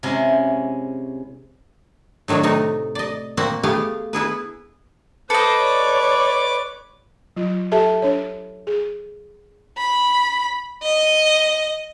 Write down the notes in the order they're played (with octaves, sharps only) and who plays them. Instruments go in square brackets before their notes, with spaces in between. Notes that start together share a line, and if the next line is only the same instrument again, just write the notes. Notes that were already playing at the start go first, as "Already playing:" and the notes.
[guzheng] C3 G#3 C#4 E4 F#4
[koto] A2 D#3 F#3 D4 C#5
C3 A3 D#4
D5 D#5
A#2 A#3 C4 F#4 F#5 A#5
A3 B3 G4 G#4 F5
B3 E4 G#4 B4
[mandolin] A4 D#5 [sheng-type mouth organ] B4 D6 [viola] C5
[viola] C#5 D5
[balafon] F#3 F4
G4 A4 E5 A5
D4 C#5
G#4
[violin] B5
D#5